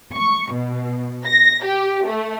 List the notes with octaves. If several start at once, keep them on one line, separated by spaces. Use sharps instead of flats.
C#6
B2
A#6
G4
A3